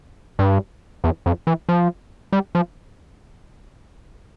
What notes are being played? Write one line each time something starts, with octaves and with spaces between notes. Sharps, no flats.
G2
E2
F2
E3
F3
G3
F3